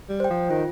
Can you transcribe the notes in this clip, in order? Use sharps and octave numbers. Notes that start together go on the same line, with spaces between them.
G3
C5 G5
F3
D#3 F4